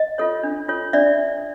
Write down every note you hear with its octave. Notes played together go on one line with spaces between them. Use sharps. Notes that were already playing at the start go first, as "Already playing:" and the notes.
Already playing: D#5
F4 A4 C#5
D4
F4 A4 C#5
D4 D5 E5